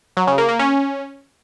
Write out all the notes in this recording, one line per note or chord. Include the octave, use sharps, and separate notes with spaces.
F#3
C#3
A#3
A#3
C#4